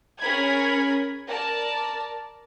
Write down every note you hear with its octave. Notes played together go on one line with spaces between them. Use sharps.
C#4 G#4 A#4 B5 G#6
A#4 D5 A5